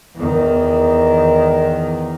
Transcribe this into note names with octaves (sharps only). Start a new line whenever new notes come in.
E2 D#3